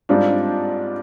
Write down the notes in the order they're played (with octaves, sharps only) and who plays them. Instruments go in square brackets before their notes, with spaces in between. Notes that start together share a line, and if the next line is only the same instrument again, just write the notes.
[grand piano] G#2 G3 C4 [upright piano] D4 F4